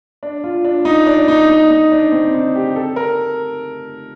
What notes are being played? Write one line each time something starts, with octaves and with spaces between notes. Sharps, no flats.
D4
F4
D4
D#4
D4
D#4
D#4
D#4
D4
C4
D#4
G4
A4
A#4